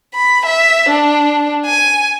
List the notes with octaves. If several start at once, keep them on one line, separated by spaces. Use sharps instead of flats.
B5
E5
D4
G#5